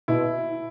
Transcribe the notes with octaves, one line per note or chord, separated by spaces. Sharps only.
B2 E4